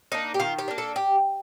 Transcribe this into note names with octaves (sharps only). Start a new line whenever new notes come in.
A#3 D4 D#4
G4
D#3 F4
G4
A#3 D4
A4
G4